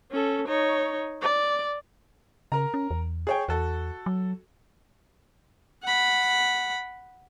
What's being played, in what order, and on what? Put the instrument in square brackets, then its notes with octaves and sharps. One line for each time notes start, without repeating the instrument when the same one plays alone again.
[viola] C#4 A4
D#4 C#5
D5
[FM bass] C#3 [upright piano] A#4 A#5
[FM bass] C#4
E2
[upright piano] G#4 C#5 G5
[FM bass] E2 [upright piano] F#4 A4
[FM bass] F#3
[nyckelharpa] F#5 B5